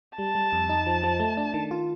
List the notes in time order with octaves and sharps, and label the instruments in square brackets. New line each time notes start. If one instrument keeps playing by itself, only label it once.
[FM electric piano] G3 [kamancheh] A5
[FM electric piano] G3
F2
D#4
F3
F3
A3
D4
D#3
F4